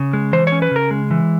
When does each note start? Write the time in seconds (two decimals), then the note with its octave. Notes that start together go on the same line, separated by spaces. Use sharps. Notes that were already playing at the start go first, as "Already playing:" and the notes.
Already playing: C#3
0.13 G#3
0.33 E3 C5
0.47 C#5
0.52 C#4
0.62 B4
0.71 C#3 A#4
0.91 G#3
1.11 E3